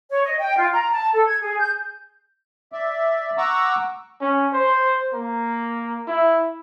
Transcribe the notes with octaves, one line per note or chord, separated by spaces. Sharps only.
C#5
D#5
G5
F4
A#5
A5
A4
G#6
G#4
G6
D5 E5
F#5 A#5 C#6 D6 E6
C#4
C5
A#3
E4